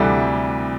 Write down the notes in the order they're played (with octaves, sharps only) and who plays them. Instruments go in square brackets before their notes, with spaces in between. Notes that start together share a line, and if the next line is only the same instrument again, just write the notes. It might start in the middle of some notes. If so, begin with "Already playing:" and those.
Already playing: [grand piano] D2 C3 E3 G3 A4